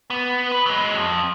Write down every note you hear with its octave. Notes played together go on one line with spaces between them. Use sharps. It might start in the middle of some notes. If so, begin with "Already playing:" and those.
B3
B4
F#3 G#3
F2